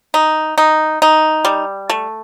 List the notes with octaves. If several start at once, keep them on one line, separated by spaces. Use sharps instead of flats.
D#4
D#4
D#4
G3
A3